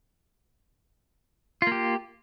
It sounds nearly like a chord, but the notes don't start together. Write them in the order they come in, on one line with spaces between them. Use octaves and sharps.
F4 A#3 G4